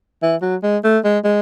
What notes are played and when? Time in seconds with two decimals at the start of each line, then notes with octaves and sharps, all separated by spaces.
0.22 E3
0.42 F#3
0.63 G#3
0.84 A3
1.05 G#3
1.24 G#3